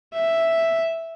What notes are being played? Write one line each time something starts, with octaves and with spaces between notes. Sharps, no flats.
E5